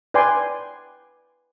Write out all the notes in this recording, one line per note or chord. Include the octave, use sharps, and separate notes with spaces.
B4 D5 G5 G#5 C6